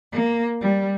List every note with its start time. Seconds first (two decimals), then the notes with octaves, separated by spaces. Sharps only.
0.11 A#3
0.60 G3